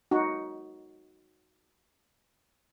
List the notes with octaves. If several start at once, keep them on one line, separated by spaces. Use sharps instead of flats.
D#4 F#4